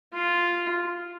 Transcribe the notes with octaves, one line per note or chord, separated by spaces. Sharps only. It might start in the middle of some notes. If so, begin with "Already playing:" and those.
F4